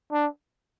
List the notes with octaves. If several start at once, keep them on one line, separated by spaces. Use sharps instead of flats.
D4